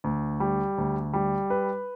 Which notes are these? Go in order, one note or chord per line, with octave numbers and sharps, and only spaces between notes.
D2
G3
D2
G3
B4